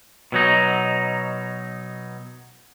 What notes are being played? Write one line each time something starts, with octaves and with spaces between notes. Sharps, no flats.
B2 F#3 D#4